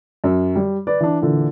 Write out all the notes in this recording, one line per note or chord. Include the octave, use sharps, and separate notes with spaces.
F#2
G3
B4 D5
E3 D4
A#2 D3 E3